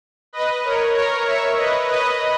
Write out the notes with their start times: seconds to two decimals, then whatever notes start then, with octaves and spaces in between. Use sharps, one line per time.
0.33 B4 D#5
0.64 A#4 C#5
0.95 A#4 C#5
1.26 C#5 E5
1.57 B4 D#5
1.88 B4 D#5